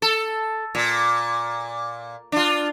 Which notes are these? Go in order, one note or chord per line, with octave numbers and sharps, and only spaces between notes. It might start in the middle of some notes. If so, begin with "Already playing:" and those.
A4
A#2
D4 F4